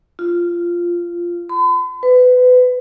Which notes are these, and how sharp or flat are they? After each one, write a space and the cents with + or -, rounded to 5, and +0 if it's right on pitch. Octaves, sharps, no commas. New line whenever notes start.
F4 -10
B5 +45
B4 +25